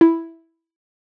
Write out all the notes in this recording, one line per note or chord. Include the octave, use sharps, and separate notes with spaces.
E4